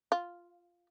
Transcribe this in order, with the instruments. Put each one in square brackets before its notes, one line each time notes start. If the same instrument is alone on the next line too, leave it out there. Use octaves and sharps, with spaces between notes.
[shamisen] F4